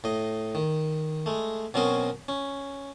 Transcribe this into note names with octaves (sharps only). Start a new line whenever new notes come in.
A2 D#5
D#3
G#3 A3
B2 F#3 C4 C#4 A#4 D#5
C#4